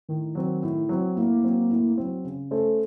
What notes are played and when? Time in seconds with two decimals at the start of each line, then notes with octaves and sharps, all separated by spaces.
0.08 A2 D#3
0.35 F#3 C4
0.63 A2
0.89 F#3 C4
1.16 A2 A#3
1.43 F#3 C4
1.70 A2
1.98 F#3 C4
2.24 C#3
2.51 A3 C#4 A4 C5